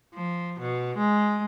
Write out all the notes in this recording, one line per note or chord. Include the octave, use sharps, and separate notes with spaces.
F3
B2
G#3